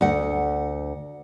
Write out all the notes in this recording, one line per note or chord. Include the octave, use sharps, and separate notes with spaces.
D2 F#5